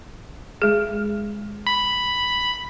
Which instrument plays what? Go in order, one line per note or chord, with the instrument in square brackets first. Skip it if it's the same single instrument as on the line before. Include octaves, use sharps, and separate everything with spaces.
[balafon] G#3 G#4
[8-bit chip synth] B5